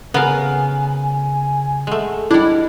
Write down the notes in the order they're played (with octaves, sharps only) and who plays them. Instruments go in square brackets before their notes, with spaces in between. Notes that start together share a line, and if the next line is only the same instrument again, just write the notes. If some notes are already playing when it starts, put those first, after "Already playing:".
[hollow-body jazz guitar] C#3 G#4 [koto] B3 A#4 F5 [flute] G#5
[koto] G#3 A3 [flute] F#5
[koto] G3 D4 [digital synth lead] E4 [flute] D#5